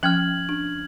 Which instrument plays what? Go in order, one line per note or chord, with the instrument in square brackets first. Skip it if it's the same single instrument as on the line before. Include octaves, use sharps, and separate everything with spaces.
[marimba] F3 C#4 G5 [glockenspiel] F6 G#6 F#7
[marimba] D4